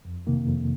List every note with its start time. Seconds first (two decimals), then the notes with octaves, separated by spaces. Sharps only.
0.05 F2
0.27 C3 D#3 A#3
0.47 F2